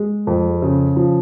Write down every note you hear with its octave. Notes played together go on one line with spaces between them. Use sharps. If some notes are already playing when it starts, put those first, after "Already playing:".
Already playing: G#3
F2
C#3
F3